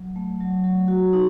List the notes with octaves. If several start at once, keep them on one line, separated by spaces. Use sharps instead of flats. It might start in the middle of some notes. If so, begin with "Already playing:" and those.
Already playing: F#3
A3
F#3
F#3
F#4
D#4